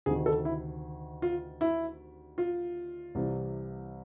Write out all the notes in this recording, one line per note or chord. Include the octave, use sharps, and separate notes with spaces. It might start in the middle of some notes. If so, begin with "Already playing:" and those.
D2 C3 D#3 G#4
A4
E4
F4
E4
F4
C2 C3 E3